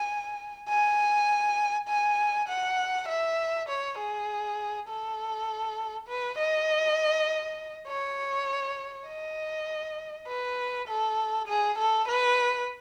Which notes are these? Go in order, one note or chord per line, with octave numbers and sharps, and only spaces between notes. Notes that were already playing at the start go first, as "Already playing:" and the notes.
Already playing: G#5
G#5
G#5
F#5
E5
C#5
G#4
A4
B4
D#5
C#5
D#5
B4
A4
G#4
A4
B4